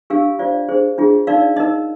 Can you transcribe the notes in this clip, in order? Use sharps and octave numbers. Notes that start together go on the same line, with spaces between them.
D4 G4 A#4 F5 G#5
F4 C5 D5 F5
D4 G#4 C5
D4 F4 G#4
D#4 A#4 D5 F5
D#4 A#4 D#5